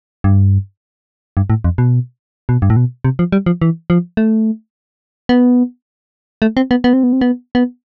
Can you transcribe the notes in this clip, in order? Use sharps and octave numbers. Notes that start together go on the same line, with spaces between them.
G2
G2
A2
F2
B2
B2
G2
A2
B2
C3
F3
G3
F3
E3
F3
A3
B3
A3
C4
B3
B3
C4
B3
C4
B3
B3